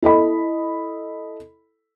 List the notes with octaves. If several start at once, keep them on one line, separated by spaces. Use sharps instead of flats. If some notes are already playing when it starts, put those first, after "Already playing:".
E4 A4 D#5 B5